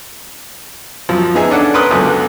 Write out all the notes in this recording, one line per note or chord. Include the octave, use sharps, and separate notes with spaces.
F#2 F3
B3 D#4 G#4 E5
C#4 D4 A4 F#5
A#4 B4 B5 C6 D#6 F#6
C#2 F#2 D3 B3